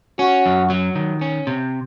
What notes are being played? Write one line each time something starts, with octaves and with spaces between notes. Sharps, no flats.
C#4 F#4
F#2
F#3
D#3
C#4
C3